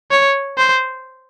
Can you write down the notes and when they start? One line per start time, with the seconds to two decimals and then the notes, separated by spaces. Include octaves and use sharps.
0.11 C#5
0.58 C5